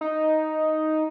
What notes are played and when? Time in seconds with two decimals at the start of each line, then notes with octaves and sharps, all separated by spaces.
0.01 D#4